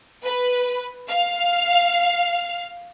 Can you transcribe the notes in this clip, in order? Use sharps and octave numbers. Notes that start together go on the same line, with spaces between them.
B4
F5